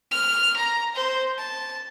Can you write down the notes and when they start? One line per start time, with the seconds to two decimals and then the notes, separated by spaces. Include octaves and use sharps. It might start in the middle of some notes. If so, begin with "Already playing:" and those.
0.11 F6
0.56 A#5
0.95 C5
1.38 A5